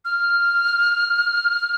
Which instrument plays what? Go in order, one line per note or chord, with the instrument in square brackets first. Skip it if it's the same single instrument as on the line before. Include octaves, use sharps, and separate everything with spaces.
[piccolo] F6